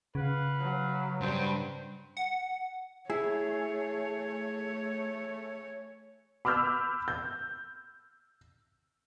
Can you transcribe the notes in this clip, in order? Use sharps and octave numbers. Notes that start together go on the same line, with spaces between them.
C#3 B4 F5 F#5
F#3
G2 G3 C5
F#5
A3 E4 G#4 C#5
B5 D6 E6 F6 G6
G6